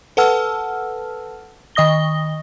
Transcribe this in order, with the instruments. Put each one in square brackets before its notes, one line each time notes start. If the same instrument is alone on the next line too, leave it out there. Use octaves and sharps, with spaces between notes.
[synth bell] A4 B4 F#5 A5 E6 F6
D#3 D#5 D#6 A#6 G7